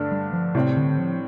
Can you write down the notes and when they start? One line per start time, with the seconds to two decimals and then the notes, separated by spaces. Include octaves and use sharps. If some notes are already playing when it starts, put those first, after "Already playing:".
Already playing: G2 D3 A3 D4
0.12 G3
0.33 F3
0.55 A2 C3 G3 C4
0.77 D3
0.98 F3